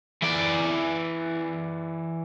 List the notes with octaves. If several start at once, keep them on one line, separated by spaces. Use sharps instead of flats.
E3 D5